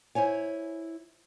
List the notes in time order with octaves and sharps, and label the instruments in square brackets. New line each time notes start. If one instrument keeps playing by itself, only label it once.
[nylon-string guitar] E4 C5 C#5 G#5